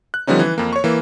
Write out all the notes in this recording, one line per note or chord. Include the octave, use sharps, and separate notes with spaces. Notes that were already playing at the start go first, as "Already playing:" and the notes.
F#6
D3 F3 G3 B3 C#4 D#4
E3
F2 A#3
C#5 C#6
E3 A#3